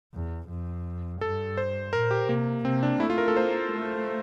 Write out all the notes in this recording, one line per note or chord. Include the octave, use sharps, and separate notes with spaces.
E2
F2
G2 A4
C5
A#2 A#4
G4
C3 A#3
C3 C4
D4
A3 E4
F4
A#4
A4
A#3 C5
A3